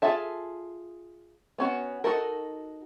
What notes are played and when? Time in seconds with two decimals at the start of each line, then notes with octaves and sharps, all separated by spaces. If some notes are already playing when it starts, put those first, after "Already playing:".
0.02 F4 G#4 A4 E5 A5
1.58 B3 C#4 F#4
2.04 D#4 F#4 A4 A#4